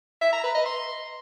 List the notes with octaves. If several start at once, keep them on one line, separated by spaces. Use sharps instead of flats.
E5
A#5
B4
D#5
C6